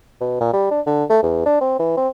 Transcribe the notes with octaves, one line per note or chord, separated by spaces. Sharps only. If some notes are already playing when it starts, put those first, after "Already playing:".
B2
A#2
G3
D4
D3
A3
E2
D4
C4
E3
C4